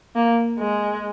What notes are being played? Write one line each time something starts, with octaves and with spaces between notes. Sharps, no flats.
A#3
G#3